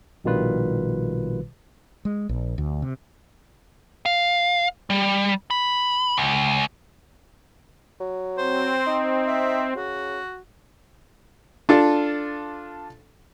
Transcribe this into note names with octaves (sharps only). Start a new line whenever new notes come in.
A#1 B2 D#3 G3 F4 B4
G#3
A#1
D2
C3
F5
G3
B5
C#2
F#3
C4 C5
D#4
E5
C#3 F#4
D4 F4 A4